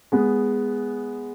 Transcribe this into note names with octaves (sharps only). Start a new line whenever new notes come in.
G#3 B3